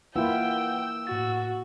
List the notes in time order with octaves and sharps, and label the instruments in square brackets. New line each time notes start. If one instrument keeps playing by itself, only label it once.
[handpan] A#3 E4 F4 [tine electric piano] B4 F#5 [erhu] G5 [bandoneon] E6
[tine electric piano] A2 A6 [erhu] F#4